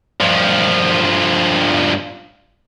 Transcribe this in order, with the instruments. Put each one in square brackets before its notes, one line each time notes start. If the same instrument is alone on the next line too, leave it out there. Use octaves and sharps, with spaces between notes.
[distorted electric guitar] G2 F3